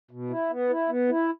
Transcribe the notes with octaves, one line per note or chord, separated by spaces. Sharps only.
B2
E4
B3
E4
B3
E4